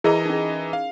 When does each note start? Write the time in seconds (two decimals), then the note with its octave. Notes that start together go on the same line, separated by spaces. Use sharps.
0.04 E3 E4 G#4 A#4 D#5 A#5
0.26 C#4 D#4
0.73 F5